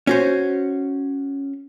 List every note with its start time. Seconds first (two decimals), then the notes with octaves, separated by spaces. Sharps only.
0.07 C#4 F#4 C5